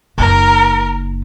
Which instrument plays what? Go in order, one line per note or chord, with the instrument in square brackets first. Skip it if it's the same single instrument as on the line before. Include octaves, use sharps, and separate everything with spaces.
[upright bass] F#1 D#4 [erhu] A#4